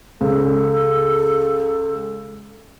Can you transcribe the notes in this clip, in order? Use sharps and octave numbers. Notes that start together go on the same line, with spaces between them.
C#2 A4